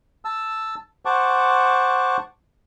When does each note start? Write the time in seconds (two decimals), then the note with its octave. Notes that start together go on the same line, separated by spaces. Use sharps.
0.25 A5 E6
1.05 C5 F#5 A5 C#6 D6